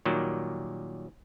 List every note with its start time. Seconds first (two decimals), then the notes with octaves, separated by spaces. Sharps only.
0.05 A#2 D#3 F#3 G3